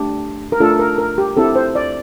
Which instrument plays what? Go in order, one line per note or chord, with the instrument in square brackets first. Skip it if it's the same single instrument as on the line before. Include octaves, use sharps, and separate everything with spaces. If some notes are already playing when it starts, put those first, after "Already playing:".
Already playing: [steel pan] A3 D4 G4
A#4
A3 D4 F4 A4
A#4
A#4
G4
C4 E4 G4 A4
C5
D5